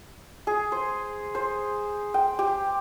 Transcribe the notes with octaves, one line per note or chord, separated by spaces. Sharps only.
G#4
C5
C5
G5
G4